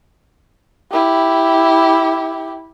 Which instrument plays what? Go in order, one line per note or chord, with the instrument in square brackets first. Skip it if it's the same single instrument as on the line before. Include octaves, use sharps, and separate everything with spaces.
[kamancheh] E4 G4